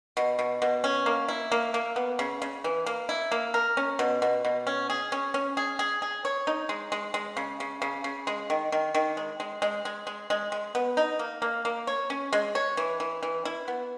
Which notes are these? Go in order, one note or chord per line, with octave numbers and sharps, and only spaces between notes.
B2
B2
B2
C#4
A#3
E4
A#3
A#3
B3
C#3
C#3
E3
A#3
E4
A#3
A#4
C#4
B2
B2
B2
C#4
G#4
C#4
C#4
G#4
G#4
G#4
C#5
D#4
G#3
G#3
G#3
C#3
C#3
C#3
C#3
G#3
D#3
D#3
D#3
G#3
G#3
G#3
G#3
G#3
G#3
G#3
B3
D#4
A#3
A#3
A#3
C#5
C#4
G#3
C#5
E3
E3
E3
E4
B3